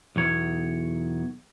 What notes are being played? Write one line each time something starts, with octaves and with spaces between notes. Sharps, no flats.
B1 E2 C#5